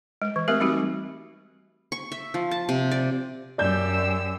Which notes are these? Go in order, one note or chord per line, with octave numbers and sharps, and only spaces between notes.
G#3
E3
A3 C4 G4 A#4 E5
G3 C4 D#4 F#4 G4
C#6
E5
F3
A5
C3
D5
F#2 G4 D5 E6 G6